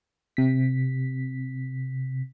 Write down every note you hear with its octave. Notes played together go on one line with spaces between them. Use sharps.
C3 B6